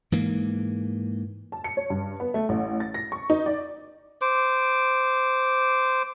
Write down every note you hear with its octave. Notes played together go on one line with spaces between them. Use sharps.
G#2 E3 A#3
A5
C#7
C#5
G2
B3
A3
A1
A6
A#6
C#6
D#4
D5
C5 D6